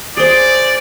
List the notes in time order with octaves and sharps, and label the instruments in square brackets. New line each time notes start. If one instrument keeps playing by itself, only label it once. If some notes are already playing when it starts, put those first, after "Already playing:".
[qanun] G#4 C5 [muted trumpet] D5